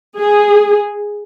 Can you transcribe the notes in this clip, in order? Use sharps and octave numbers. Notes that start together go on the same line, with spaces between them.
G#4